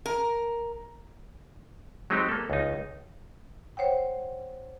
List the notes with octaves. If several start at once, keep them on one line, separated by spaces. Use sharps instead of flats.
A#4
F#3 G#3 C4 D#4 G4
A#3 A4
C#2 D#4
C5 C#5 F#5 G5